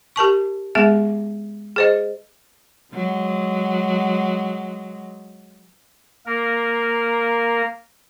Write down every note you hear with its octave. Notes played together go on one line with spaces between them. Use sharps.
G4 A#4 A5 C#6
G#3 B3 G#4 E5
G#4 C5 D#5
F#3 G#3
A#3 A#4